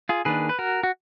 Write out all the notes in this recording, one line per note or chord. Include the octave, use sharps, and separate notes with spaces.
F4 G#4
D#3 A#3 D4 G#4 B4
B4
F#4 A#4
F#4